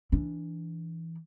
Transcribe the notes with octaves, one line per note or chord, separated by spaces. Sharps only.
E3 D4